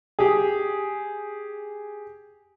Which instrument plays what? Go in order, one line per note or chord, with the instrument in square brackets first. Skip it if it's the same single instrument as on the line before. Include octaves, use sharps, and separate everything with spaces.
[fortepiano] G4 G#4